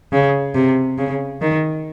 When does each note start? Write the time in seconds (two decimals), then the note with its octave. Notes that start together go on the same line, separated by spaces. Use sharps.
0.13 C#3
0.55 C3
0.98 C#3
1.42 D#3